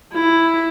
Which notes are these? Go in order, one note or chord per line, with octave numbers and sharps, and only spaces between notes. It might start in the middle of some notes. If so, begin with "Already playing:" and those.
E4